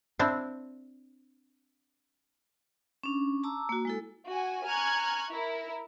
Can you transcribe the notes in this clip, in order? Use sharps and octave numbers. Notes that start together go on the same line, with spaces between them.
C4 D4 E4 C5
C#4 D4
A5 A#5 D6 E6
A#3 F#4
G#3 E4 A4
F#4 G#5
G#5 A#5 C#6 F6 F#6 G#6
E4 A#4